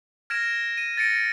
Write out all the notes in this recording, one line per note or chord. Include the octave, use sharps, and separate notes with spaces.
F6 G#6 A#6 D7 E7
D#7
A6 A#6 C#7 D7